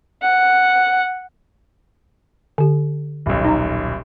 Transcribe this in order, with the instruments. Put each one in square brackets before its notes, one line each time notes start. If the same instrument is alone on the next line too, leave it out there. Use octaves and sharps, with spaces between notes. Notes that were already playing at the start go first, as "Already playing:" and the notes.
[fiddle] F#5
[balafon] D3 G4
[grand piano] D#1 B1
[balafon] D#4 A#5